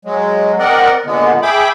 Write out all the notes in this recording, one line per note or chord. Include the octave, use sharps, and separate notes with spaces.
F#3 G#3
C4 A#4 D5 D#5 F#5
A#2 D3 G#3 B3
G#4 E5 G5 B5 D6